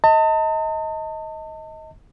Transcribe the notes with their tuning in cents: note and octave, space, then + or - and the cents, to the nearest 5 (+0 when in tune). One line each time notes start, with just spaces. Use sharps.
D#5 +25 A5 +40